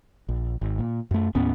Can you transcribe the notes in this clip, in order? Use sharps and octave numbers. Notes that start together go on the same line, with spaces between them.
A#1
G#1
A#2
F#2 A3
D#2 A2 B3 C#4